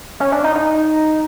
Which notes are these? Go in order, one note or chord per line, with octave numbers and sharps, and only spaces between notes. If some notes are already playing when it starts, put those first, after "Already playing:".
C#4
D4
D#4
D#4